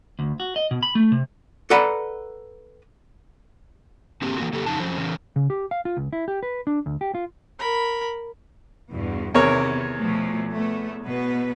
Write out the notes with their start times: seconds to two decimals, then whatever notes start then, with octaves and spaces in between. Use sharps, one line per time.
0.19 D2
0.40 F#4
0.56 D#5
0.71 B2
0.83 B5
0.95 A3
1.12 C3
1.70 A4 B4 D5 F#5 A#5 B5
4.22 D3 A#3 C4 G4
4.38 E3 A#3 F#4
4.53 C#3 A#3 G4 A4
4.66 F2 C#3 D#4 A5
4.80 F2 F3 F#3 C#4 C5
4.98 C#3 E3 C#4
5.36 C#3
5.50 G4
5.71 F5
5.85 F4
5.97 C#2
6.13 E4
6.28 G4
6.43 B4
6.67 D4
6.86 D2
7.01 G4
7.15 F4
7.59 A#4 B5
8.92 E2 G2 B2
9.35 E2 C3 D#3 B3 A#4 C#5
9.98 B2 F3 A3
10.53 A3 B3
11.03 B2 B3 B4